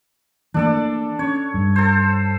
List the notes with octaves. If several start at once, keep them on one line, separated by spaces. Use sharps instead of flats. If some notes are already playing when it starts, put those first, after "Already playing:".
E3 A3 A#3 D4 A4 D5
C#4 C#5
G2
A4 C5